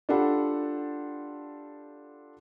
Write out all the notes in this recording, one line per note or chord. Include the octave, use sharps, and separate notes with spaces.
D4 F4 G4 A4 F#5 B5